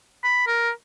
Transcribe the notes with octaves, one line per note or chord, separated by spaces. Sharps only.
B5
A#4